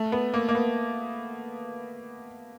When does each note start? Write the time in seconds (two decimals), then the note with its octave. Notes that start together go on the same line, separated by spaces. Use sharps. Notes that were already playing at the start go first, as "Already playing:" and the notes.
Already playing: A3
0.12 B3
0.34 A#3
0.49 A#3
0.55 B3